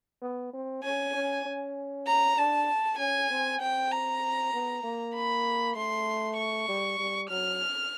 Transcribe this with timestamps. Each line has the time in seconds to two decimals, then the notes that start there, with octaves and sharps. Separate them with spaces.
0.22 B3
0.53 C4
0.84 C#4 G#5
1.15 C#4
1.46 C#4
2.07 A#5
2.37 D4 A5
2.99 C#4 G#5
3.31 C4
3.61 C4 G5
3.92 A#5
4.53 B3
4.83 A#3
5.15 B5
5.76 A3 C6
6.37 C#6
6.68 G3
6.99 G3
7.30 F#3 F6